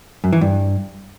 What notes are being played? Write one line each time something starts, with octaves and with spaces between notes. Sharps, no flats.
F#2
E3
G2